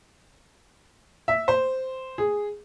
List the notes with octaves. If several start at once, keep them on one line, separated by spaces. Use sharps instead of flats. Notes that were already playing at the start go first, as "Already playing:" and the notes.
E5
C5
G#4